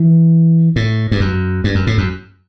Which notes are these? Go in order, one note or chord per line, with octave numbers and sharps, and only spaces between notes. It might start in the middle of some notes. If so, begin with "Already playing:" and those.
Already playing: E3
A2
G2
F#2
G2
F#2
A2
F#2